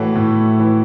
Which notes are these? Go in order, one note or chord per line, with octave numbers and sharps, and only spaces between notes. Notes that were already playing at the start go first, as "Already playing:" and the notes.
Already playing: A2 E3 F#4 A4 B4 C#5
A2
E3